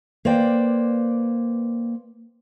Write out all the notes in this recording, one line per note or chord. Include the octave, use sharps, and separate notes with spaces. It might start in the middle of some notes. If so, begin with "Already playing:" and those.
A#3 B4 C5 D5 G5